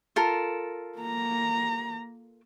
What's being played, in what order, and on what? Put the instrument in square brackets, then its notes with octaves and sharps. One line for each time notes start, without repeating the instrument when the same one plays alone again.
[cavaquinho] F4 A4 A#4
[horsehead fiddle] A#3 A#5